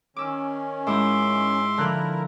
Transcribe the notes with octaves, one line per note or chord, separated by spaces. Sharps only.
D#3 C#4 D6 E6
G#2 E4 E5 C6 D6 D#6
D3 F3 E4 A#4 A#5 F#6